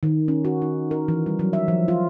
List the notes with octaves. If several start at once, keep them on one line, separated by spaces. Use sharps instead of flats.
D#3
C#4
F#4
D#4
A#4
E3
G3
F#3
E5
F3
F4